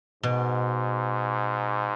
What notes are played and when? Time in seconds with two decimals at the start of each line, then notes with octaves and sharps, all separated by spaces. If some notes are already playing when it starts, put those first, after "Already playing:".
0.23 G#2 B2